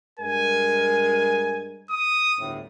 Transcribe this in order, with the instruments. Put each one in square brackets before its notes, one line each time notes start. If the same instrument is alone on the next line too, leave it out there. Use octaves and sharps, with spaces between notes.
[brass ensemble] G2 G#3 A#4 [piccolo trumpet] G#5
[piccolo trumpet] D#6
[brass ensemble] G1 D2 A2